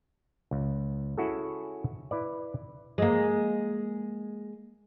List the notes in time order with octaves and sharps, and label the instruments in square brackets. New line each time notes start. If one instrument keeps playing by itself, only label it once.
[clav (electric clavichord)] C#2
C#4 E4 F#4 G#4 A4
E4 B4 D5
[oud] G#3 A#3